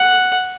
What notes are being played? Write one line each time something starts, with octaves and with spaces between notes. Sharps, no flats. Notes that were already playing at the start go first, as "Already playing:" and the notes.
Already playing: F#5